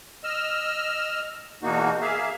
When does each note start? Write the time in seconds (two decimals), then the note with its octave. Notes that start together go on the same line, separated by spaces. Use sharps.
0.24 D#5 E6 F6
1.63 E2 B2 A#3 D#4 F#4
2.01 A#3 G#4 E5 F5